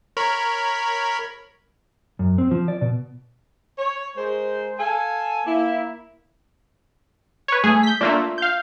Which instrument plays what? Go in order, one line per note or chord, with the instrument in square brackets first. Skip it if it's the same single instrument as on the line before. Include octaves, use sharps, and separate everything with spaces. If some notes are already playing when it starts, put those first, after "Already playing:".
[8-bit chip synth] A#4 C#5 B5
[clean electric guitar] F#2
C4
F3
D5
B2
[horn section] C#5
G#3 A#4 C5
A4 F5 G#5
A#3 E4
[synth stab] B4 C#5
[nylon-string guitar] A3 [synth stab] G#4
[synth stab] G6 B6
[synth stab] A3 A#3 D4 [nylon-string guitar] F4 E5
[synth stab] F5 G6